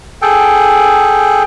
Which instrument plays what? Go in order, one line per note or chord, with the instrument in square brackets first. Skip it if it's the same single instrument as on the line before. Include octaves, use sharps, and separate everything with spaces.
[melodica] G#4 A4 G5